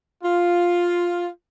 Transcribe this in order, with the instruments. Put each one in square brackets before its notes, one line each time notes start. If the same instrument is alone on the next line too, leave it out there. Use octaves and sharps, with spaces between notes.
[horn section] F4